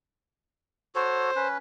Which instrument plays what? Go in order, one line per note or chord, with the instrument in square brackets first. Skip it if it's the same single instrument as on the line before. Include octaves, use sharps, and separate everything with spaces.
[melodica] F#4 A4 C#5 [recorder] C5
[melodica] C#4 B4